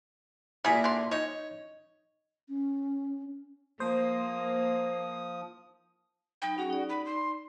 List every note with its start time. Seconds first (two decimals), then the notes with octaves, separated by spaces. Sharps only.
0.65 A#2 G3 E4 G#4
0.84 D3 C6
1.12 D#4 C#5
2.49 C#4
3.80 F3 A#3 C5 D#6
6.42 F#3 D#4 G5 B5
6.58 C#4 F#4 G#4
6.70 D#4 D5
6.89 B5
7.06 C6